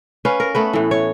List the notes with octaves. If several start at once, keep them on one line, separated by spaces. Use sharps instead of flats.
C#4 B4 F5
A#4
A3 B3 B4
A2 E3
C#5